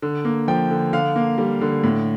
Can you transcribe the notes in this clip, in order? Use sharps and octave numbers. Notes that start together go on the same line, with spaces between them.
D3
A#3
F3 G5
D3
D3 F5
A#3
G3
D3
A2